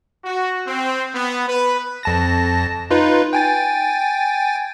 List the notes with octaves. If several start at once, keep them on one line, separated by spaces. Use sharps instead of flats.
F#4
C4
B3
B4
F2 A5 A#6
D#4 F4 B4
G5 G#5 A6